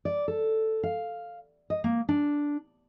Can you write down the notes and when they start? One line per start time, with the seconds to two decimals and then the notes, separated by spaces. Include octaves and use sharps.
0.05 D5
0.28 A4
0.83 F5
1.70 D#5
1.84 A#3
2.09 D4